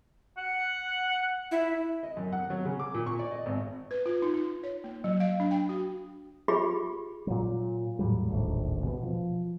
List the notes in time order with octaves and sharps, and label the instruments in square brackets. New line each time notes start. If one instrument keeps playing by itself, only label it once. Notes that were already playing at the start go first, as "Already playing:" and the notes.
[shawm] F#5
[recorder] E4
[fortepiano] D#5
F#2
F#5
F#3
C#3
D6
A#2
C#6
D5
D#5
G#1
[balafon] B4
F4
D#4
D#4
C#5
A#3
F#3
F5
D4
G5
F#4
[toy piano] F4 G4 G#4 B5
[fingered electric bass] A#2 F#3
E2 A2 F#3 G3
E1 A#1 D#2 A2
B2 G#3 B3
F3